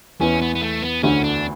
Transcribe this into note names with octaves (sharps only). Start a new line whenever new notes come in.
E2 E3 C#4
B3
B3
A3
B3
D2 D3 C#4
D4